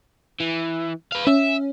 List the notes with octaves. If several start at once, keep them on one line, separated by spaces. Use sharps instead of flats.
E3
B4 F5
C#4 E5